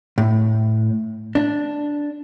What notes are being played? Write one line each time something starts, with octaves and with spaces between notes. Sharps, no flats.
A2
D4